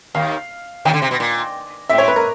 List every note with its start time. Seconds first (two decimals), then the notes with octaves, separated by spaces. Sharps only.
0.15 D#2 D#3 F5
0.85 D#2 D#3 G5
0.94 D3
1.02 C3
1.11 B2
1.20 A#2
1.89 A2 E5
1.98 C#5
2.08 B4
2.16 A#4